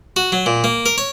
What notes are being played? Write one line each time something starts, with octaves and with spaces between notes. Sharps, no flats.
F#4
F#3
A#2
A#3
A#4
C#5